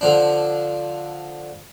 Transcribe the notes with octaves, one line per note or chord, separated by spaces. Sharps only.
D3 F3 D4